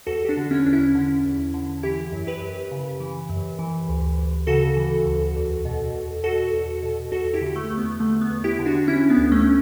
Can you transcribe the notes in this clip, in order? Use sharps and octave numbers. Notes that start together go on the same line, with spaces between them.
E2 F#4 A4
G4
D4 F#4
D3
C#4 E4
E2 D4
C#4 E4
D3
E2
D3
E3 E4 G4
F#2
G4 B4
F#2
C#3
E3
F#2
E3
D2
D2
C#3 F#4 A4
E3
D2
E2
B2
E2
B2 F#4 A4
E2
B2
E2 F#4 A4
E4 G4
D3
A3
E2 A3
B3
D3 A3
B3
E2
E4 G4
D3
D4 F#4
E3 C#4 E4
B3 D4
D2
A3 C#4